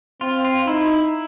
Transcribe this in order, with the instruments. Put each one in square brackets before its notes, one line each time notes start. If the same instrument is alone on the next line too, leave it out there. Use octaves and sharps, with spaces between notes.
[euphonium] C4 [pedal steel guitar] F4
[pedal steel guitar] F4
[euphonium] D#4 [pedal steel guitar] E4